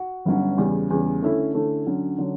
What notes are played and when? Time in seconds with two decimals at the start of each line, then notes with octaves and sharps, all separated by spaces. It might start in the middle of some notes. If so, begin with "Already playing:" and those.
Already playing: F#4
0.25 G1 G2 F#3 C#4 F#4
0.57 E2 C#3 G3
0.90 E2 C#3 G3
1.22 D3 A3 C#4 E4 A4
1.54 D3 A3 C#4 E4 A4
1.87 D3 F#3 C#4
2.18 D3 F#3 C#4